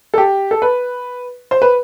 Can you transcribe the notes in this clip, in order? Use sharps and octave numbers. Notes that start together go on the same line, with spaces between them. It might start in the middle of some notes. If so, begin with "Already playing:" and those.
A4
G4
A4
B4
C5
B4